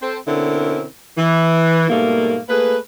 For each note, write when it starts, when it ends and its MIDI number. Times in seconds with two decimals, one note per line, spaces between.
0.02 0.18 60
0.02 0.18 69
0.02 0.18 72
0.27 0.86 47
0.27 0.86 50
0.27 0.86 60
0.27 0.86 61
0.27 0.86 64
0.27 0.86 70
1.18 1.85 52
1.90 2.39 44
1.90 2.39 47
1.90 2.39 55
1.90 2.39 57
1.90 2.39 58
2.49 2.78 57
2.49 2.78 58
2.49 2.78 68
2.49 2.78 71